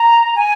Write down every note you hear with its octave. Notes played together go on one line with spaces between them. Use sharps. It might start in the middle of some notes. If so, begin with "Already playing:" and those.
Already playing: A#5
G#5